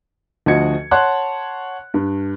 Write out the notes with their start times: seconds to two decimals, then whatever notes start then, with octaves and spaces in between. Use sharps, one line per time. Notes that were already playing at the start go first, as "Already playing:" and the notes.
0.46 D2 F3 F#4 D#5 G#6 C#7
0.91 C#5 F#5 A5 C6 F#6
1.94 G2